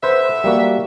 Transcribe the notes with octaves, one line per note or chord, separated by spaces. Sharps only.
B3 A4 B4 C5 E5
G3 A#3 F#4